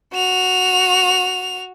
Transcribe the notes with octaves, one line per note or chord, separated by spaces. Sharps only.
F#4 F7